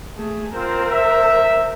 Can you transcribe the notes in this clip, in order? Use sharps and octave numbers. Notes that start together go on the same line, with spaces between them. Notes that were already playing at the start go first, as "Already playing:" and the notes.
A3 G#4
C4 F4 A#4 C5
E5